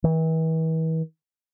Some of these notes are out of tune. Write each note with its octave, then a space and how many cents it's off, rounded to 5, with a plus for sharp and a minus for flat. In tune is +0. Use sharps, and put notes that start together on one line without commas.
E3 -40